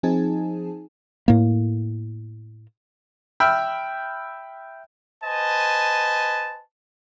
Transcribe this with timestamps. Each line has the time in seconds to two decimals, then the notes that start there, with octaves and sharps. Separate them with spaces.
0.03 F3 C4 D#4 G#4 G#5 A5
1.28 A2 A#3
3.40 E5 G5 B5 E6 F6
5.24 B4 C5 D#5 G#5 A5